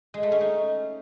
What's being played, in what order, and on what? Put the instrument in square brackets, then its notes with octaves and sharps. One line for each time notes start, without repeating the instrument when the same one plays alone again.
[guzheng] G#3
A3
C#4
D#4